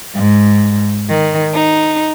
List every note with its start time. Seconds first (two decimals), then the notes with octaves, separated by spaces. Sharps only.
0.15 G#2
1.10 D#3
1.53 D#4